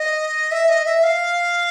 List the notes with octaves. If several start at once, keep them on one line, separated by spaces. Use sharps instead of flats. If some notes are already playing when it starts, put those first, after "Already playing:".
Already playing: D#5
E5
D#5
E5
F5